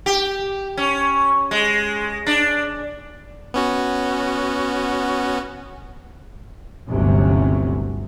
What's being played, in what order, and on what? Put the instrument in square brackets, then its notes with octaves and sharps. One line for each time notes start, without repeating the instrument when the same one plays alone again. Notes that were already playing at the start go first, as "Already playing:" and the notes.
[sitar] G4
C#4
G#3
D4
[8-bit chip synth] B3 C#4 F#4
[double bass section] G1 D2 C3 F#3 C#4